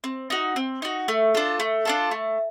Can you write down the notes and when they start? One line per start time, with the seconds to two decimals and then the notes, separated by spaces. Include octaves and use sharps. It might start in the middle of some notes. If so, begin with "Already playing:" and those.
0.04 C4
0.30 D#4 F#4
0.56 C4
0.82 D#4 F#4
1.08 A3
1.35 D4 F4 A4
1.60 A3
1.85 D4 F4 A4
2.11 A3